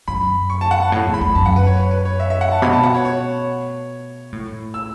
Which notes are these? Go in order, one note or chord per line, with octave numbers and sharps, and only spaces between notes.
F#2 B5
C#6
A5
F#5
A5
A2 A5
E2
B5
E2
F#2 A5
F#5
B4
C#5
B4
B4
C#5
E5
E5
F#5
A5
B2 B5
A5
F#5
C#5
C#5
A2
E6